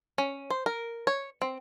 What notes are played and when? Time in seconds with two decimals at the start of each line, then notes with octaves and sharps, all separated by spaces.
0.18 C#4
0.50 C5
0.66 A#4
1.07 C#5
1.42 C4